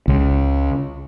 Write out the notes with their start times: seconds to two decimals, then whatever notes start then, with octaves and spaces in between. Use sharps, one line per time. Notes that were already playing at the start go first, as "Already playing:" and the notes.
0.08 C#2